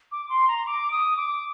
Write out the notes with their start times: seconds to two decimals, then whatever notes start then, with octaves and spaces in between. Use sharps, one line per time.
0.12 D6
0.29 C6
0.48 A#5
0.67 D6
0.92 D#6
1.17 D6